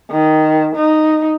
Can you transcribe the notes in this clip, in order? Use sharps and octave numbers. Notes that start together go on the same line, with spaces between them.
D#3
D#4